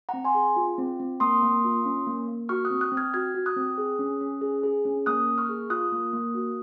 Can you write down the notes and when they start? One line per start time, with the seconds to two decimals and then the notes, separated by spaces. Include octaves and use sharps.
0.09 C4 F#5 A#5
0.25 G#5 C6
0.35 G#4
0.56 F4
0.78 C4
1.00 C4
1.20 A#3 C6 D#6
1.42 A#3
1.64 F4
1.85 C#4
2.07 A#3
2.28 A#3
2.49 F#4 C#6 F6
2.65 D#6 F#6
2.70 C4
2.81 D#6 F#6
2.92 C4
2.97 F6 G#6
3.14 F#4 F6 G#6
3.35 F#4
3.46 D#6 F#6
3.56 C4
3.78 G#4
3.99 C#4
4.21 C#4
4.41 G#4
4.64 G#4
4.85 C#4
5.06 A#3 D#6 F#6
5.28 A#3
5.38 C#6 F6
5.49 G#4
5.70 F4 D#6 F#6
5.92 A#3
6.13 A#3
6.35 F#4